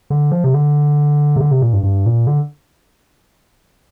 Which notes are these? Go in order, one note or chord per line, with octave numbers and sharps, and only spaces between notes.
D3
F3
C3
D3
C3
D3
C3
A#2
G2
G2
A#2
D3